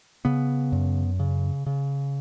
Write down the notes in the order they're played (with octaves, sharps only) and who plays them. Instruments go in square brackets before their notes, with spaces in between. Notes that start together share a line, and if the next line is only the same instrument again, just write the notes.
[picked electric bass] C#3 B3
F#2
C#3
C#3